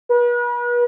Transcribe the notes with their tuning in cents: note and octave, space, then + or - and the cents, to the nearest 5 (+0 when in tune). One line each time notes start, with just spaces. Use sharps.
B4 -40